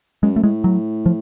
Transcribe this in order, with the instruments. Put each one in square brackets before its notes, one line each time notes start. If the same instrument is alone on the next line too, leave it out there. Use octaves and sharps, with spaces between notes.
[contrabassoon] F#2 [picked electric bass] G#3
[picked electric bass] A3
[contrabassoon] A2 [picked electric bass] G#3
[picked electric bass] F#3
F3